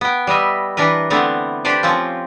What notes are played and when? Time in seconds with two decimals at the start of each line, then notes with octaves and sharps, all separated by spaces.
0.01 B3 G5
0.27 G3 B4 D#5 E5
0.77 E3 D4 A#4 B4
1.10 D3 E3 A3 B3 C4 D4
1.65 D4 G4 B4 C5 D5
1.83 F3 C4 C#4 F4